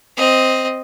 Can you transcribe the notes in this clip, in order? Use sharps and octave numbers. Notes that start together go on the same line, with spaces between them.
C4 D#5